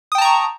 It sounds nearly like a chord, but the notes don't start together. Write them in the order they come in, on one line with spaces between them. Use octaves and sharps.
D#6 G5 A5 A#5 C#6